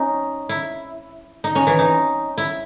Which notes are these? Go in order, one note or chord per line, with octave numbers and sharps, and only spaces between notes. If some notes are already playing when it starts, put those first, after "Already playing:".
Already playing: C#4 D#4
E4
D#4
C#4
E3
D#4
E4